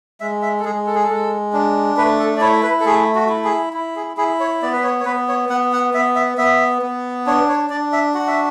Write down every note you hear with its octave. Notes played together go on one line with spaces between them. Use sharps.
G#3 E5
E5
A4
G#3 G#4
A4
G#4
A4
G#3
D4
A3 B4
A4
D5
E4 C#5
B4
A4
A3 G#4
F#4
E4
G#4
E4
G#4
E4 G#4
C#5
B3 D5
B4
C#5
C#5
B3 B4
C#5
B3 F#5
F#5
B3 E5
E5
B3 E5
B3
D4 C#5
C#5
D4 D5
E5
F#4 F#5
E5